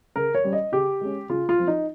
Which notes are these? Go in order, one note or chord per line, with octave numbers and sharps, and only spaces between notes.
C#3 A#4
C#5
G3 C#4
D#5
C#3 G4
G#3 C#4
C#3 F4
F4
F3 C4
D#4